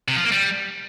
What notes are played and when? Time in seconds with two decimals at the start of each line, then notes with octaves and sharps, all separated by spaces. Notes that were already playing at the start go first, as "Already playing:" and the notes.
0.08 C3
0.16 F3
0.24 A#3
0.32 G3